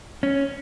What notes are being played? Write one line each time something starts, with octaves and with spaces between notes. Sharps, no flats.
C#4